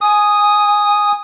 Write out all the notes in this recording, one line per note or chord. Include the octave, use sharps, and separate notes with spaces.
G#5 D#6